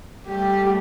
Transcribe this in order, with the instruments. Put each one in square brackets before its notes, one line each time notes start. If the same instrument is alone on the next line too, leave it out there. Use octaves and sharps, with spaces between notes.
[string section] G3 A3 [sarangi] G4